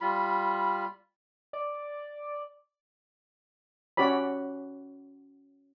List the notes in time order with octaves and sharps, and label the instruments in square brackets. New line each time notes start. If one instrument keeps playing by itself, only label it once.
[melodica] G3 F4 B5
[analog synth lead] D5
[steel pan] C#4 F#4 C#5 D5 B5